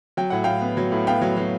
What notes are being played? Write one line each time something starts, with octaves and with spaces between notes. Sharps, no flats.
F#3 G5
A2 F#5
A2 F5 G5
B3
F#3
A2
B3 F5 G5
F#3
F#3